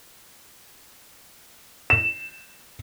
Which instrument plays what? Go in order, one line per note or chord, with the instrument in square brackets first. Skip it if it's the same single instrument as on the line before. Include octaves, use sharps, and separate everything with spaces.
[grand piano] E7